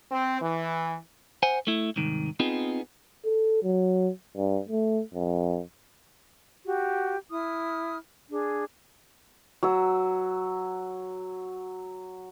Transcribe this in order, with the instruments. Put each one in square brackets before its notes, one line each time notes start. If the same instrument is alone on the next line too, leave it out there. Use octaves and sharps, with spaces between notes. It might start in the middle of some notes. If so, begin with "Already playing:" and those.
[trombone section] C4
E3
[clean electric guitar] C5 F#5 G#5
A3 E4
C2 G#2 D#3
B3 C4 D#4 F4 G#4
[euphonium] A4
F#3
G2
A3
F2
[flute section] F#4 G4
E4 D#6 F6
D4 G#4
[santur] F#3 E6